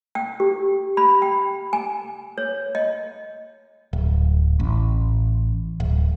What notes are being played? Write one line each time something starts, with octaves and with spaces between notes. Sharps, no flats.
G5
G4
B5
G5
G#5
C#5
D#5
D1
A1
D1